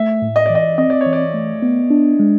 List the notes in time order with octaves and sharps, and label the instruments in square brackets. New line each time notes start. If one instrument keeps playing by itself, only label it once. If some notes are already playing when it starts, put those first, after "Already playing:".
Already playing: [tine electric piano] A3 [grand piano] E5
[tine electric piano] A2
[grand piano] D#5
[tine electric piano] E3 [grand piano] D5
[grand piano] D#5
[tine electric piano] C4 [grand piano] D#5
[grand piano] D5
C#5
[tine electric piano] E3
[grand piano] D5
[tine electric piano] A3
B3
D4
G#3